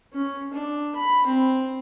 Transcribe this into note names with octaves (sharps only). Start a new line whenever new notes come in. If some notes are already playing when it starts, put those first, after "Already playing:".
C#4
D4
B5
C4